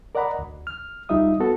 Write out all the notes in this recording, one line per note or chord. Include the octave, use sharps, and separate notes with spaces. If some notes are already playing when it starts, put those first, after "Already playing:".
A#4 D5 D#5 F#5 A#5 B5
D2
F6
D2 G3 D#4 F4 E5 D#6
B3 F#4 A4